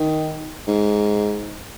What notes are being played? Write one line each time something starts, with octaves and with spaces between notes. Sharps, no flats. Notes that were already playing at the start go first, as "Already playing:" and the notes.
Already playing: D#3
G#2